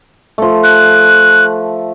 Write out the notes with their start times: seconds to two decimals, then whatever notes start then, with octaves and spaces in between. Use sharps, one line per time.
0.38 F3 A3
0.64 F#6